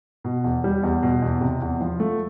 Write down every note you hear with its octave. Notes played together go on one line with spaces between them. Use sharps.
B2
E2
G3
E2
B2
E2
C3
E2
F3
A3